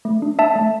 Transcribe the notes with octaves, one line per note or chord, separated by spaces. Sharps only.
A3
D4
D4 E5 A5
A3